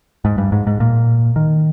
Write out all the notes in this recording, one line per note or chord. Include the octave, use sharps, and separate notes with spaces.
G#2
G2
G#2
G#2
A#2
D#3